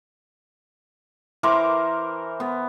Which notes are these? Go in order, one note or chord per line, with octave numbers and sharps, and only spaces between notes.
E3 A#4 C5 D6
B3